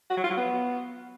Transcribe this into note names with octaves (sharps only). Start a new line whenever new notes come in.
F#4
F#3
F4
F#3
B3